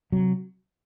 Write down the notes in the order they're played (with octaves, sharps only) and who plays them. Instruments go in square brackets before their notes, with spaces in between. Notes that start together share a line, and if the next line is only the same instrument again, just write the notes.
[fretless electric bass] C3 F#3